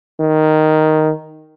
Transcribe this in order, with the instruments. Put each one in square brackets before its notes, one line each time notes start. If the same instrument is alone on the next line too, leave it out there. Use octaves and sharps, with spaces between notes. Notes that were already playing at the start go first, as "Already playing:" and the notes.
[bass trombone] D#3